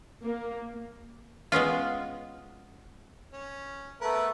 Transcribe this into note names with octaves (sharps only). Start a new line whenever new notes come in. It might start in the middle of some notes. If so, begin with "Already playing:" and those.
A#3
G#3 B3 C#4 F4
C#4
A3 B3 A#4 B4